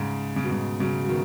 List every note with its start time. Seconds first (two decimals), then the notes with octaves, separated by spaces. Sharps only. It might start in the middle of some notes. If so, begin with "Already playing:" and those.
Already playing: G#2 C#3
0.36 C#3
0.44 B2
0.51 G#2 C#3
0.80 C#3 F#3
1.05 F#3
1.09 B2 D#3